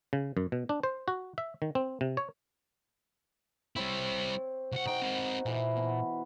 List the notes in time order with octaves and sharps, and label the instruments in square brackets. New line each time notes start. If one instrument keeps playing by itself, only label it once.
[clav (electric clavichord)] C#3
F#2
B2
D4
C5
F#4
E5
D#3
C4
C3
C#5
[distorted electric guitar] G3 E4 [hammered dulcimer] C4 C#5
[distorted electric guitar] C2 F#5 [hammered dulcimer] F#4
[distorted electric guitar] B1 G5 [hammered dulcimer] D#4 C5
[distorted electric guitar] C4 A#4
[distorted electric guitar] A#2 [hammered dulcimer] E3 B4 C5
[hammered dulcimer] B2